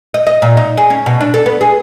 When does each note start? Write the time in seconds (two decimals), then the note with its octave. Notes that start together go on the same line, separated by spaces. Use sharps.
0.14 D#5
0.27 D#5
0.42 A#2
0.57 D#4
0.77 G#4
0.90 C#4
1.06 B2
1.21 D4
1.34 A4
1.46 B3
1.61 G#4